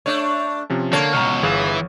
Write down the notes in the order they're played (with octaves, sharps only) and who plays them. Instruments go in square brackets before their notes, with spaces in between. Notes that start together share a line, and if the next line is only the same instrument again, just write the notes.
[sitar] A3 D4 [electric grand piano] C#5
[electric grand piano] C3 F3 C#4
[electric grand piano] D3 A5 G#6 [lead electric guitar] A#3 [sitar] C#5
[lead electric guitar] C#2 B2 [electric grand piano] A#5 C#6 F6
[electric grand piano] G1 G#4 F5 [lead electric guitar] E3